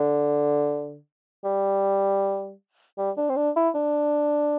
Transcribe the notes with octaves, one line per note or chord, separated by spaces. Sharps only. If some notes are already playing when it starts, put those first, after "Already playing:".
Already playing: D3
G3
G3
D4
C4
D4
E4
D4